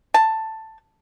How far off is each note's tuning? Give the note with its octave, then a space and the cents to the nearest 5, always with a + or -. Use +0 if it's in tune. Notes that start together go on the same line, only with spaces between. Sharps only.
A5 +10